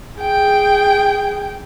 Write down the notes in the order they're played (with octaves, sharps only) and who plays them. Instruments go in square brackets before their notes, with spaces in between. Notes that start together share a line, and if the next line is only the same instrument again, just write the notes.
[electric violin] G#4 [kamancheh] G5